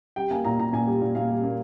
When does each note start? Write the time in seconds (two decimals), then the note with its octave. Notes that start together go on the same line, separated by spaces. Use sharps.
0.16 G3 G5
0.31 A#3 G#5
0.45 A#2 A#5
0.59 A#2 A#5
0.73 A#2 G#5
0.87 G3
1.02 A#2
1.15 A#2 F5
1.29 G3
1.43 A#3